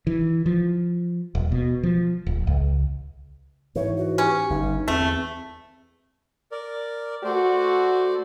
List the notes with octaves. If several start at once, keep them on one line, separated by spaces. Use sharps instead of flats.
E3
F3
D#1
B2
F3
D1
C#2
G#2 E3 C#5
F#4
C#4 G4
G1 G2 D#4
E2 A3 C4
A#4 D5
A3 F#4 C5 D5